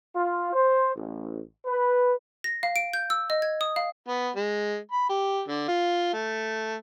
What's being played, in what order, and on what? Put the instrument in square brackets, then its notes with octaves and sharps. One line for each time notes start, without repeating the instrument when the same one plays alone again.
[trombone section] F4
C5
A1
B4
[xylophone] A#6
F5
D7
G6
E6
D#5
G#6
D#6
F5
[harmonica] B3
G#3
B5
G4
D3
F4
A3